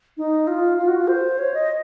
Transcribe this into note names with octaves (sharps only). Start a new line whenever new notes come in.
D#4
F4
F4
F#4
F4
C5
C#5
D#5